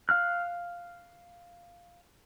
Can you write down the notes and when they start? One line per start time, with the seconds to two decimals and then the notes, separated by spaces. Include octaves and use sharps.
0.09 F5 F6 F#6